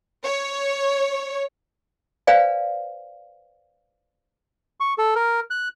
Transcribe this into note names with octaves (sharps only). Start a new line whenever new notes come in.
C#5
B4 C5 D5 F5 G#5
C#6
A4
A#4
F#6